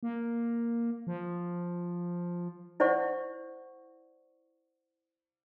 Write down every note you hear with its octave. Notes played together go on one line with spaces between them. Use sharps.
A#3
F3
E4 C5 D5 F#5 C#6